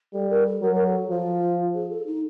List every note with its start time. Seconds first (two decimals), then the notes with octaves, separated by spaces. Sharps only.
0.13 G3 A4
0.29 A#4
0.46 A4
0.61 F#3 A#4
0.74 A#4
0.85 A4
1.10 F3 F4
1.74 G#4
1.90 A4
2.06 D#4